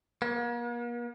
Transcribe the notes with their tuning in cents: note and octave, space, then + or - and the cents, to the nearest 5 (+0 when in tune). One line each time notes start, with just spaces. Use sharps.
A#3 +40